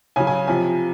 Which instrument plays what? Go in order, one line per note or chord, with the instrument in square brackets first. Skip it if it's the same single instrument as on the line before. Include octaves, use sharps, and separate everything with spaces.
[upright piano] C#3 F#3 G#5
G#5
C3 F3 G#5